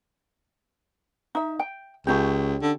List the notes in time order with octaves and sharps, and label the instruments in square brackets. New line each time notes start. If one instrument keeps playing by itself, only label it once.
[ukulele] D#4 E5
G5
[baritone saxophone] C#2 [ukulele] C#4 D#4 G4
[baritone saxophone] D3